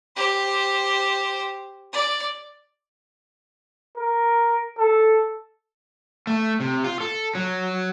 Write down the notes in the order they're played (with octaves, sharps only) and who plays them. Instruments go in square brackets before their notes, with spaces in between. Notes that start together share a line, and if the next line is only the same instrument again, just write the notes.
[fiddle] G4 C5
D5
[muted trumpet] A#4
A4
[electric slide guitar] A3
C3
F4
A4
F#3